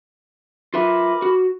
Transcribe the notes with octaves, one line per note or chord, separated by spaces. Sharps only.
F4 A#4 B4 E5 B5 D6
F#4